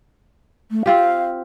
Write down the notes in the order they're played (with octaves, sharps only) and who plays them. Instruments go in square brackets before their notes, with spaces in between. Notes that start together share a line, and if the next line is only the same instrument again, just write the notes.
[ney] A3
[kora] C4 F4 G4 [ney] F5